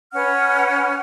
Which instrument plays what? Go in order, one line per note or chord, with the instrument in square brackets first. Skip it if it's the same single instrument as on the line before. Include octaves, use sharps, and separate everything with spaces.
[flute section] C#4 B4 F#5 F6